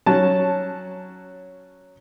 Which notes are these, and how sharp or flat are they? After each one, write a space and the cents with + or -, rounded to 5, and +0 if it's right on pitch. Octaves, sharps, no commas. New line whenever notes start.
F#3 +0 C#4 +0 A5 +0